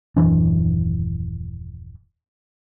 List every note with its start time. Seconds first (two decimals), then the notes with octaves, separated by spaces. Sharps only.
0.17 D#1 F#2 E3 D4